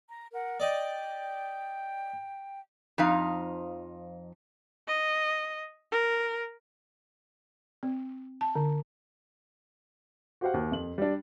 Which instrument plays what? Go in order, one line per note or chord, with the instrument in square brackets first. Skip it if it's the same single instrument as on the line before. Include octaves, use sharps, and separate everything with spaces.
[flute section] A#5
A#4 F#5
[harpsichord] D5 D#5 [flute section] G5
[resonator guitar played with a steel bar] F2 F3 D#4 F5
[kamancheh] D#5
A#4
[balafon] C4
A5
D3
[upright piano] F#4 G4 C5 F5 F#5
D#2
F2 F#7
G3 D4